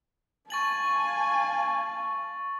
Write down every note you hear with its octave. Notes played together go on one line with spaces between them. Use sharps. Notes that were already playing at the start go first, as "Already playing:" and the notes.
F5 G#5 A5 C#6 A6 F#7